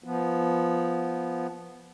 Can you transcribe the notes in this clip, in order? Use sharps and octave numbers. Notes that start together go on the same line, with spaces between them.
F3 B3